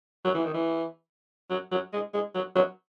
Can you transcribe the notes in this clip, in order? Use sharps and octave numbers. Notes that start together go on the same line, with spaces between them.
F#3
E3
D#3
E3
F#3
F#3
G#3
G#3
F#3
F#3